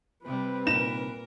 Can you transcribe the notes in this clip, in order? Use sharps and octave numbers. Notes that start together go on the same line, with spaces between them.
C3 G3 C4 B4
C2 F#2 A#2 D#4 A#4 E7